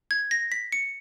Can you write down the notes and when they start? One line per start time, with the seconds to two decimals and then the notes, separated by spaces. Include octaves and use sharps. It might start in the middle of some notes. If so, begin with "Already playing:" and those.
0.11 G#6
0.31 A#6
0.52 B6
0.72 C#7